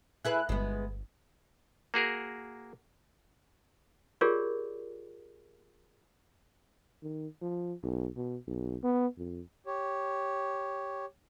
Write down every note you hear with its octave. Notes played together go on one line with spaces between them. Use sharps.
E4 G#4 B4 F#6
G1 G#3 B3
A#3 F#4 G#4 A#4
F4 G4 G#4 A#4 C#5 D5
D#3
F3
B1
B2
B1
B3
F2
G4 C#5